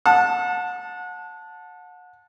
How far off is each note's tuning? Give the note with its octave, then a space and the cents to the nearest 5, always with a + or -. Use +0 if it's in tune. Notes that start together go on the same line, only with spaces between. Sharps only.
F#5 -30 A5 +0